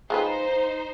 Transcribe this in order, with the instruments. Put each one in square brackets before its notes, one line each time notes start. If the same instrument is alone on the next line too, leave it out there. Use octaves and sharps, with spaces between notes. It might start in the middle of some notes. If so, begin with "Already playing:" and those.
[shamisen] G#3 F4 B4 [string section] D#4 C5